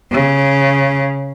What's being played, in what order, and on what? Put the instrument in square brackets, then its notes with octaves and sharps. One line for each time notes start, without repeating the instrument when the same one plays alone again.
[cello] C#3